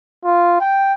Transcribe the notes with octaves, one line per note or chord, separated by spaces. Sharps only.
F4
G5